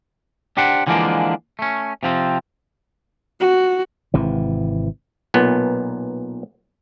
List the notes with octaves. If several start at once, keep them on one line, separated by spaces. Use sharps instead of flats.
D4 G4 C5 F#5
D3 E3 F3 G#3 A#3 D4
A3 C#4
C3 F3 C4
F#4
G#1 C3 E3
B1 A#2 B3